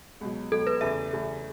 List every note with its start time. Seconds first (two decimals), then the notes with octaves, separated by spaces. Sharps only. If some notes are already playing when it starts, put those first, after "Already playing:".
0.21 C#2 B2 F#3
0.51 C#2 B2 F#3 A4
0.67 B4
0.81 E2 C#3 A3 E5
1.12 E2 C#3 A3